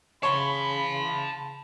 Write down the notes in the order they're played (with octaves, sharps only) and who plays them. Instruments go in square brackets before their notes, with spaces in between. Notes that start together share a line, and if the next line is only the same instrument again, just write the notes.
[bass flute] C#3 [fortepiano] C#5 [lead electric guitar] A5 C6 [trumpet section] B5